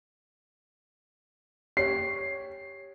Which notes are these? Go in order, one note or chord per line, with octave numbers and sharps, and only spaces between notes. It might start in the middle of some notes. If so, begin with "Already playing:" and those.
G4 C#5 C7